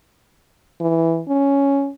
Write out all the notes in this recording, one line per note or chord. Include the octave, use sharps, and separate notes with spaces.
E3
C#4